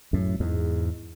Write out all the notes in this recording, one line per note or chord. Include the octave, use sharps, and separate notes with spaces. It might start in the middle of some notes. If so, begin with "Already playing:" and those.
F#2 A2
E2 G#2